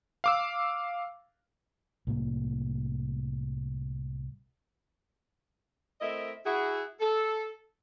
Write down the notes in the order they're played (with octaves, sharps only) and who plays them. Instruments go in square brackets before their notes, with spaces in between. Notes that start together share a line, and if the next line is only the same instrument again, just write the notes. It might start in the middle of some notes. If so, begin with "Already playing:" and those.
[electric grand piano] F5 D6 E6
[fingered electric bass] C2 A2 A#3
[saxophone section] A3 C4 E4 A#4 D#5 E5
E4 F#4 G#4
A4